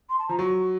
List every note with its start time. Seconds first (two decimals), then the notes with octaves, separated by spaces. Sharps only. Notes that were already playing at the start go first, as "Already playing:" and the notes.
0.09 C6
0.18 A5
0.29 F3 A#5
0.39 F#3 C#6